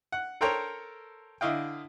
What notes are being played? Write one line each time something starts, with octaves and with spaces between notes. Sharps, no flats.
F#5
A4 A#4 C5 C#5 G5 A#5
D3 E4 D#5 F5 G5